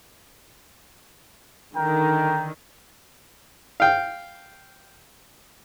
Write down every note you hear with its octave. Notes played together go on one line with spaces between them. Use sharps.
D3 D#3 A#4 G5
F5 G5